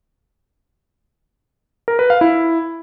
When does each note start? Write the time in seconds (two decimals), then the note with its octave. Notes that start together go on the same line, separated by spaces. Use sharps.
1.88 A#4
1.99 B4
2.10 F5
2.21 E4